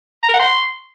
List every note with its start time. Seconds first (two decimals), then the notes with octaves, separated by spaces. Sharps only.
0.23 A#5
0.29 A#4
0.34 F#5
0.39 C6